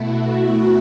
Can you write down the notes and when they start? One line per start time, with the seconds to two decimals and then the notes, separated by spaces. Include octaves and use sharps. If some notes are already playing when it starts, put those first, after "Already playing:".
Already playing: B2 A3 E4 F#4
0.23 E4